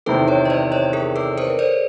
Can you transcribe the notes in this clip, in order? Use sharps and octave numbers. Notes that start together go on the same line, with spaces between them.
E2 C3 D#3 A4 B4
B4 C#5
D#5
C5 D5
C#5 D#5
G#4 A#4
A4 B4
A#4 C5
C5 D5